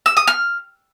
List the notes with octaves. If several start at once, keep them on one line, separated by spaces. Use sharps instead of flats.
E6
D#6
F6